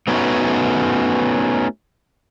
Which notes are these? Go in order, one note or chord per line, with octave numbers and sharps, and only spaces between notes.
A3 B3 C#4 D#4 F#4